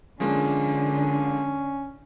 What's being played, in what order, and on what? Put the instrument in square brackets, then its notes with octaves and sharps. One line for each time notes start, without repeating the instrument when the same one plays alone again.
[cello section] D3 [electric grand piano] F3 G#3 A#3 [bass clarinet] C#4